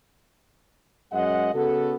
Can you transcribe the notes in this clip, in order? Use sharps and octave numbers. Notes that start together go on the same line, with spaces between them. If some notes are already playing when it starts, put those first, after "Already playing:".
F#2 G#3 D#5 F#5
C#3 B3 F#4 A4